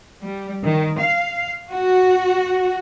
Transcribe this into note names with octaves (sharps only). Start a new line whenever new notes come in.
G3
D#3
F5
F#4